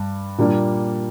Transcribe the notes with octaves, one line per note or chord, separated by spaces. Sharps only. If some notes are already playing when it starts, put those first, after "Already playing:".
Already playing: G2
A#2 G3 A#3 D4